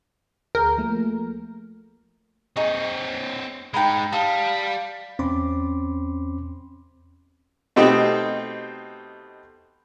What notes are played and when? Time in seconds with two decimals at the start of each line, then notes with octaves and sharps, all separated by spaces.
0.55 D2 G#4 A#4 G6
0.78 F3 A3 A#3
2.57 C4 D#4 G#4 C#5
3.74 G#3 D#4 G5 A#5 B5
4.13 G3 F5 A5 D#6
5.19 E2 C4 C#4 B5 C6 D6
7.76 B2 A3 C4 D#4 G4